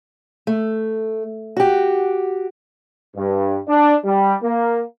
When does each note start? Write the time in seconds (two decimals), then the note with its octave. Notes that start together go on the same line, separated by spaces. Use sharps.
0.47 A3
1.57 F#4 G4
3.16 G2
3.68 D4
4.04 G3
4.42 A#3